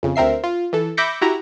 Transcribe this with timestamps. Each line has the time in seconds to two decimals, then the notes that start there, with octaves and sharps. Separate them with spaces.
0.03 F2 C#3
0.16 D2 C4 A#4 E5 C7
0.44 F4
0.73 E3 A4
0.97 E5 B5 D6 G6 A#6 C#7
1.21 E4 F#4 G4 A#5